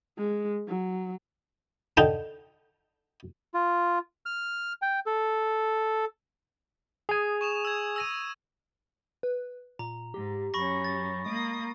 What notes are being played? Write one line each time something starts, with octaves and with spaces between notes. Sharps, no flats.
G#3
F#3
D3 D#4 G5 A5
F4
F6
G5
A4
G#4 G#5 D#6
C#6 E7 F7
E6 G#6
E6 A#6 D#7
B4
A#2 A#5
G#2 G4
F#2 C#4 B5 C#6 A#6
A6
G#3 A#3 D#6